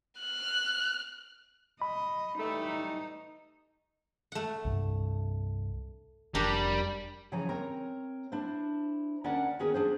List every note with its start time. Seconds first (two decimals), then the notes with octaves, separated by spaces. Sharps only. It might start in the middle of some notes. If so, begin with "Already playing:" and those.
0.20 F6 F#6
1.82 D#5 B5
2.39 E3 G3 A3 D#4
4.32 A3 F#5
4.65 C2 G2
6.35 F1 G3 D4 G4 A#4
7.32 C#3 E3 F3 C#5 G#5 A#5
7.49 C4 A#4 C#5 A#5
8.32 D4 E4 C5
9.24 D2 C#4 A#4 D5 F#5 A5
9.59 D#3 B3 C#4 F#4 G#4 A#4
9.74 D4 G#4 C5